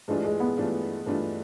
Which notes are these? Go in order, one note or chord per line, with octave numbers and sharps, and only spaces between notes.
G2 E3 G#3 A3 D4 F4
G#3
B3
G2 E3 A3 D4 F4
G2 E3 A3 D4 F4